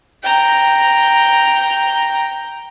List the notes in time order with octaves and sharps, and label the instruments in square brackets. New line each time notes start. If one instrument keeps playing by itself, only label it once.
[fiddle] G5 A#5